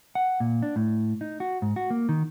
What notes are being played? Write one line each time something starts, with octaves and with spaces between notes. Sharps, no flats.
F#5
A#2
D4
A2
D#4
F#4
G#2
F#4
A#3
D#3